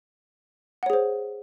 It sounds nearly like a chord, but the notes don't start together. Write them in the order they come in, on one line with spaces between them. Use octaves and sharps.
F#5 C#5 G#4 C5